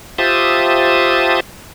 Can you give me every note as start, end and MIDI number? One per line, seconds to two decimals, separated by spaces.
0.18 1.40 65
0.18 1.40 67
0.18 1.40 72
0.18 1.40 76
0.18 1.40 81
0.18 1.40 87